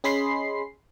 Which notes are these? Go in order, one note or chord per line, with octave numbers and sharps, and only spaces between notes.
C#4 G#4 D#5 B5 C6 C7